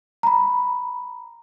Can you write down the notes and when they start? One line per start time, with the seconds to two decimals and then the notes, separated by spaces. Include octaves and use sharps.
0.23 A#5 B5